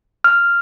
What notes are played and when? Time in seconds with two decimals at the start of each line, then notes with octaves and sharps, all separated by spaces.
0.24 F6